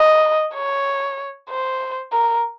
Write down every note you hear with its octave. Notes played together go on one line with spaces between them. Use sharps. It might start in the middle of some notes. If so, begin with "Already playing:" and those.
Already playing: D#5
C#5
C5
A#4